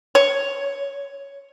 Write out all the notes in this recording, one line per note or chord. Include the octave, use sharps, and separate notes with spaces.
C#5